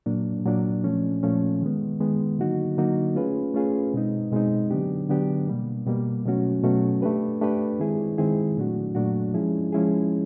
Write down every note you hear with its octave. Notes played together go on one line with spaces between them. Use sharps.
A#2 F#3 A#3 D4
A#2 F#3 A#3 D4
A#2 F3 A3 C#4
A#2 F3 A3 C#4
D#3 G#3 B3
D#3 G#3 B3
D3 F#3 A#3 D#4 F#4
D3 F#3 A#3 D#4 F#4
A3 C#4 F4 G#4 B4
A3 C#4 F4 G#4 B4
B2 G#3 C4 D#4
B2 G#3 C4 D#4
D3 F#3 B3 D4 G4
D3 F#3 B3 D4 G4
B2 G3 A#3
B2 G3 A#3
B2 F#3 A3 C#4 F#4
B2 F#3 A3 C#4 F#4
A3 D4 G4 B4
A3 D4 G4 B4
D#3 G#3 C4 E4 G#4
D#3 G#3 C4 E4 G#4
A#2 F#3 A3 D4 F#4
A#2 F#3 A3 D4 F#4
F3 G#3 C#4 E4 G#4
F3 G#3 C#4 E4 G#4